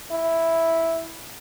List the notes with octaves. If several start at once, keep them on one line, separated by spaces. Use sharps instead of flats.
E4